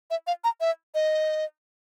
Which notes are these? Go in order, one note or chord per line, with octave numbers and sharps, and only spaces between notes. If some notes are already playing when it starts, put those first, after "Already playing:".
E5
F5
A#5
E5
D#5